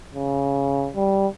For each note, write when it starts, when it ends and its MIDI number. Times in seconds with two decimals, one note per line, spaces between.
0.15 0.90 49
0.96 1.27 55